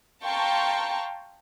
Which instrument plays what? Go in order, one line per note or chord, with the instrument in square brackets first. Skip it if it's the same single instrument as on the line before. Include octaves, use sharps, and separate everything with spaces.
[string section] F5 G5 A5 A#5 C6 C#6